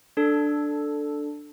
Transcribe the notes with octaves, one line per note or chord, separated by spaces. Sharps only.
D4 A4